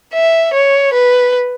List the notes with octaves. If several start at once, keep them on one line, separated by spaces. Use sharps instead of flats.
E5
C#5
B4